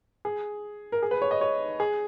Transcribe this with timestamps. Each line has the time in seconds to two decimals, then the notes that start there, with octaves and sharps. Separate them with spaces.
0.25 G#4
0.92 A#4
1.03 G#4
1.11 B4
1.22 C#5
1.31 D#5
1.41 C#5
1.80 G#4